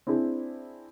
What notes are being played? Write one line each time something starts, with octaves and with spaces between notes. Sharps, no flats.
C4 D4 E4 G#4